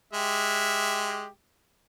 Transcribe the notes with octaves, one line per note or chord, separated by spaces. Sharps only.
G#3 G4 E5